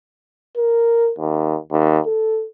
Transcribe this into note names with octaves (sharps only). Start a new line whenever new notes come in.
A#4
D#2
D#2
A4